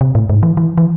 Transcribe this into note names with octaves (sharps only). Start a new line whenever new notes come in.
C3
A2
G#2
E3
E3
E3